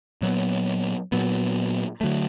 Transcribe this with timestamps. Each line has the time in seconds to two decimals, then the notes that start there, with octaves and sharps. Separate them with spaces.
0.22 A#2 F#3 B3
1.12 A#2 F#3 B3
2.01 D3 F#3 A3